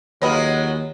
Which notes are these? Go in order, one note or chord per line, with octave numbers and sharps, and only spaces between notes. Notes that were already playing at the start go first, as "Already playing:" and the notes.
D#2 F#3 G#3 F4 B4 C#5 D#5